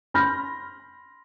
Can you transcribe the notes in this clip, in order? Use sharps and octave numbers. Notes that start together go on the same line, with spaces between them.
B5 C6 F6 G6 A#6